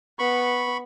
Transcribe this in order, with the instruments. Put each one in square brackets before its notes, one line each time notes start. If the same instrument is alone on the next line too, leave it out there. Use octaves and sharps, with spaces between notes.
[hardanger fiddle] B3 [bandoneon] B5 C#6